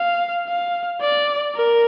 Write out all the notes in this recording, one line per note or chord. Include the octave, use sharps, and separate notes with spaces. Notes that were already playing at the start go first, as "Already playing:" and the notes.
Already playing: F5
F5
D5
A#4